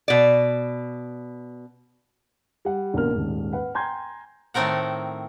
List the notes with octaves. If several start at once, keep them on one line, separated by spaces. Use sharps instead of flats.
B2 D5
G3 F#5
A1 B2 D3 A#3 A#4 F6
D#1 G#2
B4 F#5
G5 G#5 A#5 C6 G6 G#6
A2 D#3 A3 C4 A#4 F#5